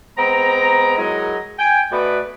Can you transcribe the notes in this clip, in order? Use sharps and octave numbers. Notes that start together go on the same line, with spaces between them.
G#3 B3 C4 A#5
F#3 G#3 D#4 E4 A#4 D#5
G5 G#5
B2 A3 B3 F#4 B4 D5